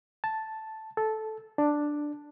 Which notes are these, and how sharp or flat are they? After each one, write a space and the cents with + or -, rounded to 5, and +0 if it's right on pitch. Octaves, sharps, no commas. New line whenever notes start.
A5 +0
A4 -10
D4 +5